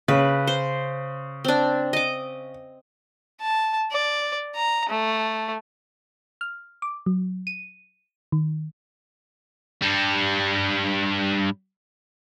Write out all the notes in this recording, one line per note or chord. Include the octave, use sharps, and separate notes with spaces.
C#3 B4
C5
C4 D4
D#5 D6
A5
D5
A#5
A3
F6
D6
F#3
D#7
D#3
G2 G3